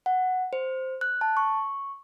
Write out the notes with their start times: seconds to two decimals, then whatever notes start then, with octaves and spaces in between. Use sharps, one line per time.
0.06 F#5
0.53 C5
1.01 F#6
1.21 A5
1.37 C#6